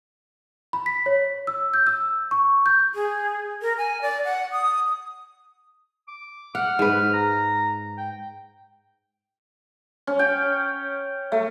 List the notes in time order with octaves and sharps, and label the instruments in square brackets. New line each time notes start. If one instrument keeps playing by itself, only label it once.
[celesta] B5
B6
C#5
E6
G6
E6
C#6
G6
[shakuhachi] G#4
A#4
G#5
D5
F#5
D#6
[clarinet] D6
[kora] F#5 [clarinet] F6
[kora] G#2 B4
[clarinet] A#5
G5
[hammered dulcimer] C#4
G5
A3